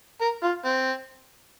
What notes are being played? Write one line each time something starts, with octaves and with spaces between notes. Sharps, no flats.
A#4
F4
C4